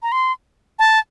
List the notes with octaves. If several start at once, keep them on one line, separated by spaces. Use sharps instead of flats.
A#5
C6
A5